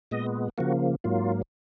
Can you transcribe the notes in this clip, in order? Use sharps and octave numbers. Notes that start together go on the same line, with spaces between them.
A#2 G#3 B3 D#5
C#3 F3 A#3 F#4
G#2 F#3 A#3 F4